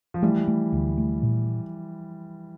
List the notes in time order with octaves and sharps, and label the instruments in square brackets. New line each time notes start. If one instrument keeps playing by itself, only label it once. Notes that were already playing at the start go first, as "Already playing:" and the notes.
[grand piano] F3
[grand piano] E3 G3 [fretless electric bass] A3
[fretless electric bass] A3
D2
A3
A#2